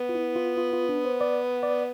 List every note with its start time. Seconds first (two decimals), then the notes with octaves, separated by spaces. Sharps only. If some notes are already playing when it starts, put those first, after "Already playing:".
Already playing: B3
0.09 F4
0.15 E4
0.36 F4
0.57 F4
0.73 F4
0.89 D4
1.05 C5
1.21 D5
1.63 D5